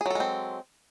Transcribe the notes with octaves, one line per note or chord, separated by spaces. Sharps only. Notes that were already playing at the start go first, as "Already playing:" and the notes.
F#3 G#3 C4 G#4 A4